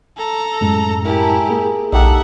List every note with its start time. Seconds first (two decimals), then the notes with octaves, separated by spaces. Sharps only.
0.17 A4 A#5
0.61 F#2 A2 G#3
1.05 E4 G4 A#4 G#5 A5
1.49 A#3 G#4
1.92 A#1 D#4 G4 A4 E5 F#5